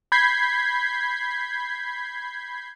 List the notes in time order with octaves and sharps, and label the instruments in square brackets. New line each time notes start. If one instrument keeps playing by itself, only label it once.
[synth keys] B5 G6 G#6 B6 C7